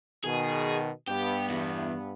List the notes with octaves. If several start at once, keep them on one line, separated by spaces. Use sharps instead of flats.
B2 D#3 G#4
G2 B3 G4
E2